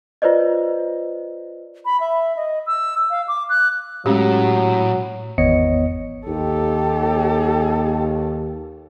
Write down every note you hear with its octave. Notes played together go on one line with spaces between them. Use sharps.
F4 B4 C5 D5 D#5
B5
E5
D#5
E6
F5
D6
F#6
A2 F#3 G#3 C#4 G4
G#1 E2 B3 C#5 D#5 C#7
D#2 G4 A4